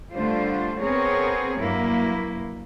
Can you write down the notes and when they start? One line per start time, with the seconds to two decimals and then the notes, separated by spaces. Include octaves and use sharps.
0.13 D3 G3 A3 D4 F4 C5
0.80 B3 C4 G#4 A#4 C#5
1.57 G2 F#3 A#3 E4